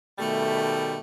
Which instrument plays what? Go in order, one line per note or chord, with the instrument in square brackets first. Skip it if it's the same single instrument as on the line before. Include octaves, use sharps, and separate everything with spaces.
[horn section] B2 D#3 G3 A3